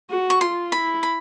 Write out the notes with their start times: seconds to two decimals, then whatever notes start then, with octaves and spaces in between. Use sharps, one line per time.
0.11 F#4
0.30 C#6
0.41 F4 C6
0.72 E4 B5
1.03 B5